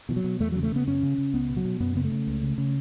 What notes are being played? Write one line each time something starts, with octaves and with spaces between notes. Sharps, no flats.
B2 E3
F#3
B2
E2 A3
C#3 F#3
A3
C#3 B3
F#2 C#4
C#3
C#3
C#2 B3
B2
F#3
B2
F#2 B3
C#3 B3
A3
C#3
C#2
C#3
C#3